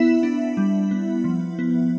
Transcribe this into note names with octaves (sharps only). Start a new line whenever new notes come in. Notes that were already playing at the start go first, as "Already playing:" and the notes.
Already playing: B3 E4 E5
D4
G3
B3
F3
B3